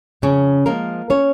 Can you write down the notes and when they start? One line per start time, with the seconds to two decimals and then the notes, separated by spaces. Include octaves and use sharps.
0.22 F2 C#3 C#4
0.66 F3 G#3 A#3 A#4
1.10 C#4 C#5